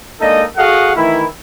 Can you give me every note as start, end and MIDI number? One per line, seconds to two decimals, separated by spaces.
0.21 0.43 56
0.21 0.43 58
0.21 0.43 62
0.21 0.43 63
0.21 0.43 69
0.21 0.43 75
0.57 0.91 66
0.57 0.91 68
0.57 0.91 69
0.57 0.91 75
0.57 0.91 77
0.57 0.91 78
0.95 1.24 51
0.95 1.24 52
0.95 1.24 57
0.95 1.24 64